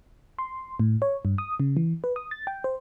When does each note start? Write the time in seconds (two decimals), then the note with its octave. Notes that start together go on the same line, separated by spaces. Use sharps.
0.39 C6
0.80 A2
1.02 C#5
1.25 G2
1.38 D#6
1.60 C#3
1.77 E3
2.04 B4
2.16 D#6
2.31 A6
2.47 G5
2.64 C5